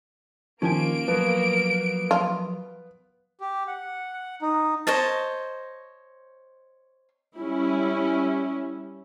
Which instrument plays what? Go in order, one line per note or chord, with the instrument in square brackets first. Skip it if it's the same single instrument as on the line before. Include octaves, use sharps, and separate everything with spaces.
[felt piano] D#3 F3 [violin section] A#3 D7 [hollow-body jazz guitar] C#4 G4 G#5
[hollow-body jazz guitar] F3 F#3 [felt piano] B3
[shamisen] F4
[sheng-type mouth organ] G4
F#5
D#4
[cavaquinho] C5 C#5 D#5 A5
[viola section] G3 C#4 E4